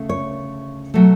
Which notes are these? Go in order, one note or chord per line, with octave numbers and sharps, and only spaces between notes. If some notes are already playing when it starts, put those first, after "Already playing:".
Already playing: D2 C#3 A3
C#5
B2 F#3 A3